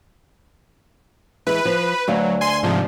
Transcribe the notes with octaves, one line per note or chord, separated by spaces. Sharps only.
E3 G#3 B4
F3
D2 F#3 B4 F5
G#5 C6
G#2 C3 F3